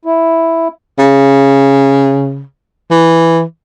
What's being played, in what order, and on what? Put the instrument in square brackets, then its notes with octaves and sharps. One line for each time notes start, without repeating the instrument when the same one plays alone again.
[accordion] E4
[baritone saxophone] C#3
E3